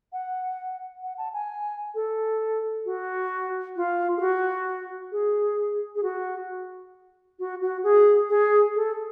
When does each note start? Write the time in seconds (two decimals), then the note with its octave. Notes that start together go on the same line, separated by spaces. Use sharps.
0.13 F#5
1.03 F#5
1.18 A5
1.33 G#5
1.95 A4
2.85 F#4
3.76 F4
4.17 G#4
4.20 F#4
5.12 G#4
5.95 G#4
6.03 F#4
7.39 F#4
7.61 F#4
7.83 G#4
8.29 G#4
8.75 A4